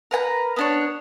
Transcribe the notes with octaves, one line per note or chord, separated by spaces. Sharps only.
A#4 B4 G#5 A#5
B3 D4 C#5